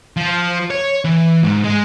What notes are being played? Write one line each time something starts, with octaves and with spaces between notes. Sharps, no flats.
F3
C#5
E3
G#2
G#3